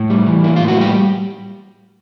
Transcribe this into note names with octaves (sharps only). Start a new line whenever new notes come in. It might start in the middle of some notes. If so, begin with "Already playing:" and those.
Already playing: A2 E4
G3
E3
A#3 E4
A2 F4
F#4
G3 G4